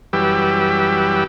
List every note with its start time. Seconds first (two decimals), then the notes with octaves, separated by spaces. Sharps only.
0.13 F#2 E3 G3 G4 B4 E6